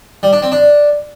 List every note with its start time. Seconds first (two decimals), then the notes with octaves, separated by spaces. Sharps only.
0.23 G3
0.33 D4
0.42 C4
0.52 D4